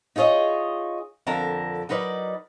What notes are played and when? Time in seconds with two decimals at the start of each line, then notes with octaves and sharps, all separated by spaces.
0.16 D#4 F4 G#4 C#5 D#5
1.27 F2 D3 A#4 A5 A#5
1.89 F#3 D#4 A#4 B4 D5